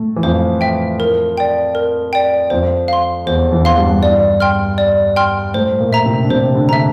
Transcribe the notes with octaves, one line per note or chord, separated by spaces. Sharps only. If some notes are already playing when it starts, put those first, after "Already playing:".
Already playing: A2 A3
E3
F2 F3 C5
E5 G5
A#4
D5 G5
A#4
D5 G5
F2 F3 C5
F5 C6
E2 E3 C5
E2 E3
F5 C6
G2 G3
D5
G5 C6 F6
D5
G5 C6 F6
A2 A3 C5
A#2 A#3
E5 A#5
C3 C4
D4
C3 C4 C5
D3 D4
E5 A#5